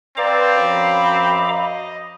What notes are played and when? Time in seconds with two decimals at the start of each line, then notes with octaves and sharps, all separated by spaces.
0.17 C4 B4 D5 F5 A#5 D6
0.57 F#2 F3 B5
1.40 D#5